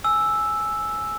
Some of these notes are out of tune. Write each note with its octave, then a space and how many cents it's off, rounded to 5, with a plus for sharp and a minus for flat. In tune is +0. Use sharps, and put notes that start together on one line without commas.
G#5 +10 E6 +0